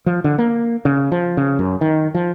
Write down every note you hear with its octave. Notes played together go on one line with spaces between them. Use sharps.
F3
D3
A#3
C#3
F3
C#3
F#2
D#3
F3